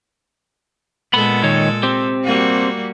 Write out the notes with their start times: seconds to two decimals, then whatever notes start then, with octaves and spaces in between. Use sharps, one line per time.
1.14 A#2 G#3 B3 A4 B5
1.43 D#3 C#5
1.83 C4 G4
2.24 G3 A#3 F#4